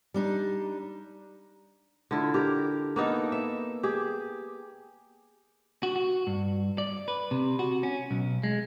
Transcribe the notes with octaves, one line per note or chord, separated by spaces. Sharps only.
G3 D4 D#4
D3 E4 F4
G4 A#4
A#3 B3 D#4 A4
E5
G4 G#4
F#4
F#4
G2
D5
B4
C3
F#4
C#4
B1
G#3